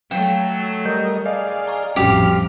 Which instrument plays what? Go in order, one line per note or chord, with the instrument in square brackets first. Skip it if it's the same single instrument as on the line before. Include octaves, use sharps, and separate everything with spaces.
[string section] F#3 A3 [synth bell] F5 E7 [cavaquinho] G5
[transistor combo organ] G3 A#4 D#5 [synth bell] G6
[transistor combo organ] G#4 D5 F5 [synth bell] D#5
[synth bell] D#5 A#5 C#6
[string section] A1 F2 F3 [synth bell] G3 C#4 F#4 [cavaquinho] G4 [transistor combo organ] F6